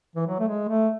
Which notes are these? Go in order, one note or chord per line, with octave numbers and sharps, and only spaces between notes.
E3
F#3
A3
G#3
A3